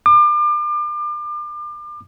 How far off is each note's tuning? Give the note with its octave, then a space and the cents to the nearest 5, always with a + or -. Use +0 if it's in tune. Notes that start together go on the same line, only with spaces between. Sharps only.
D6 +35